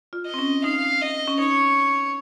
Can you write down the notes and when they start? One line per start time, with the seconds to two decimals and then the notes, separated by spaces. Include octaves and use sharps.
0.13 F4
0.26 D#5
0.34 C4
0.39 C#4
0.64 D#4 F5
1.01 D#5
1.28 C#4
1.39 D#4 C#5